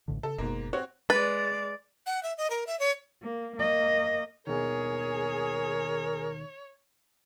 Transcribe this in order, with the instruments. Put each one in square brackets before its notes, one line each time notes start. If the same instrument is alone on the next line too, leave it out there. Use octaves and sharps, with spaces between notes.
[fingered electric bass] A1 A2 D3
[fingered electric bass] C#3 [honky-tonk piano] A4
[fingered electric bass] F#1 B2 [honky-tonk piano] G#2 A#3
[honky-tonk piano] C4 F#4 C#5
[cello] G#3 D5 [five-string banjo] B4 [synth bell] A6
[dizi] F#5
E5
D#5
A#4
E5
C#5
[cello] A#3
A#3 D#5
[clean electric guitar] D#2 B2 D#3 [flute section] G#4 [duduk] A#4 [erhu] C#5